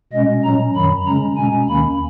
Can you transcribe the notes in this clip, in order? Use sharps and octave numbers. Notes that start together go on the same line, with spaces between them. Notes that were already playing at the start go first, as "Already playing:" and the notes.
B2 G#3 C#4 D#5
A#2 F#3 C#4 A#5
F#2 D#3 F#3 B5
C#3 G#3 C#4 A#5
B2 G#3 C#4 G#5
D#2 D#3 A#3 C#4 B5